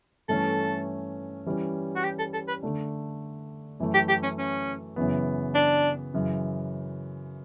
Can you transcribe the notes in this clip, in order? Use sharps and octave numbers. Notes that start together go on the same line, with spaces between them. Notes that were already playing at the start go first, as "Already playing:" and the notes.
G2 E3 A3 C#4 A4
E3 G3 C#4
F#4
G4
A4
A4
B4
D3 A3 D4
F#2 E3 A3
G4
G4
C#4
C#4
F#2 C#3 E3 B3
D4
F#2 C#3 E3